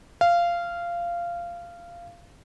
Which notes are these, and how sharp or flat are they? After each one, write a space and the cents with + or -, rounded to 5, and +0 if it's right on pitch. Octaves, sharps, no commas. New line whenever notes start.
F5 -15